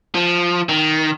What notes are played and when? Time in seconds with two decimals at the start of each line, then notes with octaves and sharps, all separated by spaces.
0.15 F3
0.69 D#3